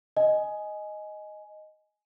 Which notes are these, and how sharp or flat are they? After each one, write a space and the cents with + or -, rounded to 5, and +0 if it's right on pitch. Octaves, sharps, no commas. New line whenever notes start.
D#5 +0 G#5 +15